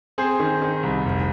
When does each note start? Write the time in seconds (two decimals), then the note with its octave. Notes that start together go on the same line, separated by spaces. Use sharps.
0.18 C4 G#4 C5
0.40 D#3
0.62 D#3
0.83 C2
1.05 F1